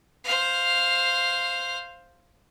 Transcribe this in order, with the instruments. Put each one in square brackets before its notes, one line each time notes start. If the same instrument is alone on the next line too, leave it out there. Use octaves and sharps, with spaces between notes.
[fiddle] C5 F5